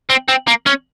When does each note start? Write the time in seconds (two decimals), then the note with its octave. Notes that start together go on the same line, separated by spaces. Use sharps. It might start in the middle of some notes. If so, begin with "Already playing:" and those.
0.10 C4
0.28 C4
0.47 A#3
0.66 C#4